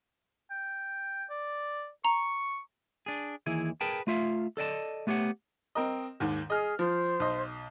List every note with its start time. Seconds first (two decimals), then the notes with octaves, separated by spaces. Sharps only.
0.51 G5
1.30 D5
2.05 A#5 C#6
3.06 D4 G#4
3.46 D#2 E3 E4 G#4
3.81 G#4 A#4 B4 G5 A5
4.07 A3 F4 E5 F5
4.57 A4 D5 D#5 A5
5.07 A3 B3 G4 C#5 F#5
5.75 C4 A#4 D#5
6.20 D#2 G#2 D#3
6.50 G#4 D#5 F6
6.79 F3 C5
7.20 B1 D#5